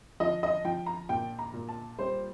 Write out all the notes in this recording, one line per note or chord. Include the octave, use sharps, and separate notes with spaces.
F3 D#5
D#5
F3 G5
A#5
A#2 G5
A#5
A#2
A5
G3 C5